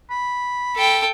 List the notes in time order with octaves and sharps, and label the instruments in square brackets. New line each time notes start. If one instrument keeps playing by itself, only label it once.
[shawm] B5
[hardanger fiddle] A4 G5